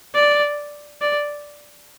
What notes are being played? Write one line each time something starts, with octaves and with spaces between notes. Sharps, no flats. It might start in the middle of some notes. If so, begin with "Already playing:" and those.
D5
D5